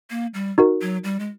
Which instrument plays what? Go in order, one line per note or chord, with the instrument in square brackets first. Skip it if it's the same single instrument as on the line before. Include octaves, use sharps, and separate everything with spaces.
[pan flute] A#3
G3
[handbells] D#4 F#4 A#4
[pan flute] F#3
G3
G#3